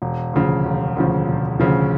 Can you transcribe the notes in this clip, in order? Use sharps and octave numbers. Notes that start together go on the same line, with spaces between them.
E1
D2 C#3 F3
E1
D2 C#3 F3
E1
D2 C#3 F3